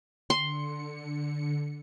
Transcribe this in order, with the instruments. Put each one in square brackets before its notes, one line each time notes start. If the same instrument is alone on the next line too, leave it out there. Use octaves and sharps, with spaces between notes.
[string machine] D3 C#7 [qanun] C6